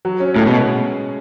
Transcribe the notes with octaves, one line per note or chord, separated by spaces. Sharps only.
F#3
C#4
A2 G#3
B2